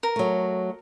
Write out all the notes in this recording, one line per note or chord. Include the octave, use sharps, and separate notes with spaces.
A#4
F#3 A3